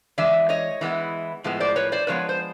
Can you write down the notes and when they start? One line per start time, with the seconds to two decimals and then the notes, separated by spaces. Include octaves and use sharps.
0.18 E3 G#3 D5 E5
0.49 C#5 D#5
0.81 E3 G#3 B3 E4
1.44 A2 F3 G#3 B3
1.60 C5 D5
1.76 B4 C#5
1.92 C5 D5
2.07 A2 F3 G#3 B3 B4 C#5
2.29 C5